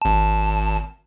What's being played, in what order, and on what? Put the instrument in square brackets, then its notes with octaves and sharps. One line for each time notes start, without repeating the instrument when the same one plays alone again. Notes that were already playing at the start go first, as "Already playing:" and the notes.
[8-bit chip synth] G#1 A5